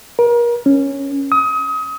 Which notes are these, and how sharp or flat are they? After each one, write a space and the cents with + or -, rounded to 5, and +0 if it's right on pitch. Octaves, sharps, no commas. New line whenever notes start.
A#4 +35
C#4 -5
D#6 +30